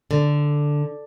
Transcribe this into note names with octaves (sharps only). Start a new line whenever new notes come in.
D3